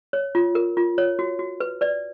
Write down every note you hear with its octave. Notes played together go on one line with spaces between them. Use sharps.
C#5
F4
A#4
F4
C#5
F#4
F#4
B4
B4 D5